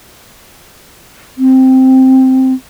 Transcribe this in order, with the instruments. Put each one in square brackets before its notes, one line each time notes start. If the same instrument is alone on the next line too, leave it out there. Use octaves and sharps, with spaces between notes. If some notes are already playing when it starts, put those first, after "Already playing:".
[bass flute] C4